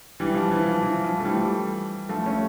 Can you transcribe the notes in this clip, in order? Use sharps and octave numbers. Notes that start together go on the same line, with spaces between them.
E3 G3
F3
E3
F3
E3
F3
A3
E3 G3
F3 A3
A3 C#4